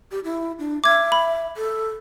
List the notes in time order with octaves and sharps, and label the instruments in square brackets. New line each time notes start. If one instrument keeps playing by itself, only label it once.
[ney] G4
E4
D4
[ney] E5 [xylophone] D6 G#6
[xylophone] B5
[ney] A4